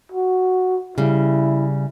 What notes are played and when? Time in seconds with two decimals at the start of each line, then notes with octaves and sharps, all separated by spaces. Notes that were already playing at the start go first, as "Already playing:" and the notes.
0.12 F#4
0.98 C#3 G3 E4